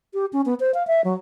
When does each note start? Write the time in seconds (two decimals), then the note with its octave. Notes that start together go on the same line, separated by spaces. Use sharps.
0.14 G4
0.33 C#4
0.46 B3
0.60 C5
0.74 F5
0.87 E5
1.04 F#3